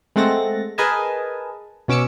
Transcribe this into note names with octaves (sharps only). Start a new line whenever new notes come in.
G#3 A3 C4 F#5 A6 A#6
G#4 A#4 B4 D#5 G#5 A5
B2 C#4 D6 E6 C#7